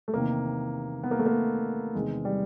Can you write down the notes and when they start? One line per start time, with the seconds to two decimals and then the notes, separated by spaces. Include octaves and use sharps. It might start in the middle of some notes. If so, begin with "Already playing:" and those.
0.08 A3
0.13 E2 C3 D#3 A#3
1.03 B3
1.11 A#3
1.19 A3
1.26 A#3
1.95 E2 C3 D#3 G#3
2.25 G3